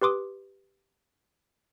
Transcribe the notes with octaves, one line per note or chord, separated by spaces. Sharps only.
G4 B4 C6 D6 D#6